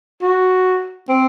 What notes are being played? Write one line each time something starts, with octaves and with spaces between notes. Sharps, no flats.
F#4
C4